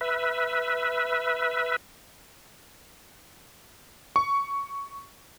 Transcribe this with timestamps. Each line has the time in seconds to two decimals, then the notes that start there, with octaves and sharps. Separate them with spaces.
0.01 B4 E5
4.16 C#6